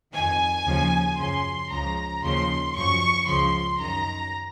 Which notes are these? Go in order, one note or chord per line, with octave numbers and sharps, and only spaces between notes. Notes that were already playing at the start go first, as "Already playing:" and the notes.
F2 D#3 G#5
D#2 C#3 F3
F#2 C#3 F3 C6
C#2 C#3 F3 A#5
D#2 C#3 F3 C6
F#2 F3 C#6
C#2 C#3 F3 C6
F#2 D#3 A#5